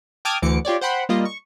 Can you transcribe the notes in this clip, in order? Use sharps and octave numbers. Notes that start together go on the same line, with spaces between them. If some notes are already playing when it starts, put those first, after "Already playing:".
G5 A5 D6 D#6 F6 G#6
D2 E3 D6 C#7
F4 G4 C#5 D5
C5 F#5 G5 B5 C6
G3 A#3 F4 D#5
C#6